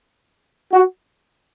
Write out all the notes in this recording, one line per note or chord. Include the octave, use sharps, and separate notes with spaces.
F#4